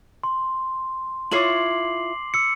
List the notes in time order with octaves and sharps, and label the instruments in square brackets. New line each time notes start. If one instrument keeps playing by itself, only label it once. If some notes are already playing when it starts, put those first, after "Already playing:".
[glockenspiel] C6
[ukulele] E4 F4 C#5 [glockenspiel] D6 C7 F#7
[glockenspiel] E6 C#7